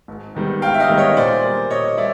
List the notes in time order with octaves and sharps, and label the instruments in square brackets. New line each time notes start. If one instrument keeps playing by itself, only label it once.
[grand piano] G#1
G#2 D#3 G3 B3
[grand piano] G#1 [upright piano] F5 G5
[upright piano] E5
D#5 F5
[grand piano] G#2 D#3 G3 B3
[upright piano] C#5 D#5
[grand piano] A#2 [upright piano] C5 D5
[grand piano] G3 A#3
[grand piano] A#2 [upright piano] C#5 D#5
[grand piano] G3 [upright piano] D5 E5